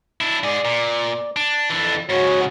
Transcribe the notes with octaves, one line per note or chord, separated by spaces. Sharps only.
D4 E4
G#2 G#4 D5
A#2
D4
F2 E3 D4
G#2 C#3 F#4 C#5